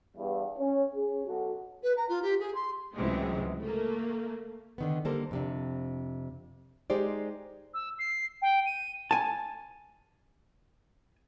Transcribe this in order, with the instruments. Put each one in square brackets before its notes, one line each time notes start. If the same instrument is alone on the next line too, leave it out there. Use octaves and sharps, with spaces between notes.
[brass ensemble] E2 G2
C#4
C#4 G#4
B1 F#4 A4
[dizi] B4
A#5
F4
G4
G#4
C6
[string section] C#2 A2 C3 E3 F#3 G#3
A3 A#3
[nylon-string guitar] D3 D#3 B3
D3 G3 A#3 A4 A#4 C5
F2 C3 D4
G#3 D#4 G4 C5 D5
[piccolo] E6
C7
G5
D#7
[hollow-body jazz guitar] G#5 A5